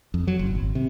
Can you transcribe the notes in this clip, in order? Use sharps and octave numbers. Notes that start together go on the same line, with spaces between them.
F2
F#3
F#1
G#1
C3